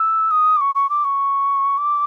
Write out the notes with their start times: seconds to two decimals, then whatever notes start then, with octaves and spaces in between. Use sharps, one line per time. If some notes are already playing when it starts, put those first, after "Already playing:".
Already playing: E6
0.31 D#6
0.56 D6
0.61 C#6
0.75 C#6
0.90 D6
1.04 C#6
1.78 D6